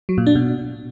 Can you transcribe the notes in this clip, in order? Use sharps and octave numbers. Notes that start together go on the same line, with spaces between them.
F#3
A#2
D4
B2